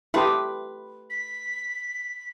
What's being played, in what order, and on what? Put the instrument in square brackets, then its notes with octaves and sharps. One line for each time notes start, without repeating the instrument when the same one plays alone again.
[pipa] A3 F4 B4 [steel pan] E4 G4 D#6
[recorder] B6